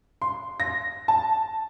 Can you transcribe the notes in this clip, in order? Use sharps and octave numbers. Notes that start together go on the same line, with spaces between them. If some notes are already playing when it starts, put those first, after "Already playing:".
C6
A#6
A5